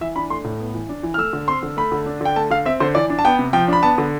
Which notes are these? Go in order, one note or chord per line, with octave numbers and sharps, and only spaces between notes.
E3 E5
D4 B5
A3 C6
A2
B3
E3
D4
E3
F6
A3 E6
D3
C4 C6
D3
A3 B5
D3
D4
D3 G5
A3 A5
D3 F5
C4 E5
D3 C5
E3 D5
D4
A5
B3 G5
C3
F3 G5
D4 B5
B3 A5
D3